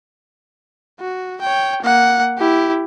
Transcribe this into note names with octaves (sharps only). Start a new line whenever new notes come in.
F#4
C#5 G5
A#3 F#5
E4 G4